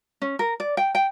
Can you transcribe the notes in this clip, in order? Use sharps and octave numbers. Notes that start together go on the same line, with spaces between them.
C#4
A#4
D5
G5
G5